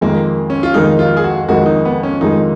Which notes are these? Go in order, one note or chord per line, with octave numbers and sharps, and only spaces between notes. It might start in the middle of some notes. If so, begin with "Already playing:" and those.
F2 D#3 G#3 A#3
C#4
F4
F2 D#3 G#3 D#4
F4
G#4
F#4
F2 D#3 G#3 F#4
D#4
B3
C#4
F2 D#3 G#3 D#4